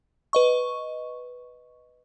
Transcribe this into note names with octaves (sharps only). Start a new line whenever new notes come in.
B4 D#5 C#6